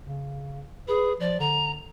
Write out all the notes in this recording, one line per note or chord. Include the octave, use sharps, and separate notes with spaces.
C#3
G#4 B4
F3 D5
D3 A#5